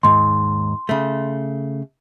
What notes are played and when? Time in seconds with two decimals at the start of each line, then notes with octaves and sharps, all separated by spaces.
0.03 D#2 G#2 C6
0.89 C#3 A3